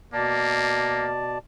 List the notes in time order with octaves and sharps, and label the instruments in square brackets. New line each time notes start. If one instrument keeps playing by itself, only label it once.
[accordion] B2 D5 A5 [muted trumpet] A#3